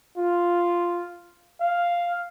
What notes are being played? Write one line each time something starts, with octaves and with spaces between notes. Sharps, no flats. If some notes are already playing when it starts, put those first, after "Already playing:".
F4
F5